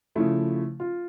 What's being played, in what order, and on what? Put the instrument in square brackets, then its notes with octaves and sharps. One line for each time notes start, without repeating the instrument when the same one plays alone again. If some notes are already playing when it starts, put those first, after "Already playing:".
[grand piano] C#3 F3 A3 [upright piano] E4
[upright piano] F4